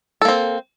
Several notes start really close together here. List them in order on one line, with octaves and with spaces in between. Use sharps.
A4 A#3 C4